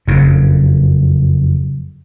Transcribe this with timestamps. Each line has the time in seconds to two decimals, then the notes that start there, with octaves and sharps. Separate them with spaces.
0.07 F#1 F2 C#3